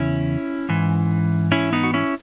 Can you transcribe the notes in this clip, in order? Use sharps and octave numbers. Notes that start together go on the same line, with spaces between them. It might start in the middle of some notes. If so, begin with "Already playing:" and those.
Already playing: E2 C#3 C#4 E4
G#2 E3
C#4 E4
B3 D#4
F#4
C#4 E4